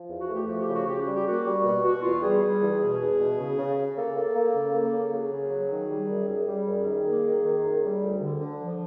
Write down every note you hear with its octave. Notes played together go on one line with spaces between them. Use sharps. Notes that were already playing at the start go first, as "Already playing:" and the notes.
Already playing: F3
E2
F#4
A3 G4
F3 F#4
G4
C#3 F#4
C#3 G4
F#4
G3
G4
A#3 F#4
G3
B2 F#4
B2 F#4
E2 F4
G3 G#4
G3
E2
B2 G#4
E2
B2
C#3
C#3
C#3
A#3 A4
A#3
A#3
C#3
A#3
C#3
F#3 G#4
C#3
F#3
D#3
G3
F#2
F#2 G#4
G3
F#2
D#3
A#3
D#3
D#3
F#2
G3
D2
D3
D3
F3